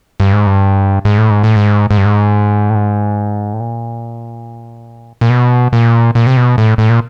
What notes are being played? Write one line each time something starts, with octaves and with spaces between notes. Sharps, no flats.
G2
G#2
G2
G#2
A2
G#2
A2
G#2
G#2
G2
G#2
A2
G#2
A2
A#2
A#2
B2
A#2
A#2
C3
B2
A2
A2
A#2